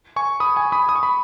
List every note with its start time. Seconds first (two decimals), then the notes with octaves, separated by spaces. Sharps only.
0.16 G#5 C#6
0.40 B5 D#6
0.56 G#5 C#6
0.72 B5 D#6
0.89 D#6
0.96 C#6
1.03 B5